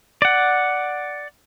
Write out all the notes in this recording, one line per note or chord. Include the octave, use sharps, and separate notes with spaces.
D5 F#5